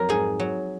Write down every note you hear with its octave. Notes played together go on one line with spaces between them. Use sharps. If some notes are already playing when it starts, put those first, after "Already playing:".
Already playing: F2 F#3 A#4
G#2 G#4
F#3